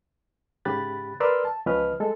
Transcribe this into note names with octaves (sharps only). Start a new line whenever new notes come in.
G#2 C#3 G4 B5 F#6 A6
A#4 B4 D5 C6 E6 F6
A5
C#2 F3 C#4 B4 D#5 F6
G#3 A4